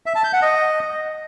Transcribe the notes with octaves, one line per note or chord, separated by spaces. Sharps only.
E5
A5
G6
F#5
D#5